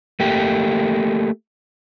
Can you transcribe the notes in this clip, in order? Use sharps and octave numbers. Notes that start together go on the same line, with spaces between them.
A3 A#3 G4